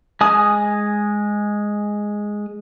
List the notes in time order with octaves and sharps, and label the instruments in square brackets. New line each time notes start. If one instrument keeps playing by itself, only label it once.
[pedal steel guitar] G#3 G#5 D#6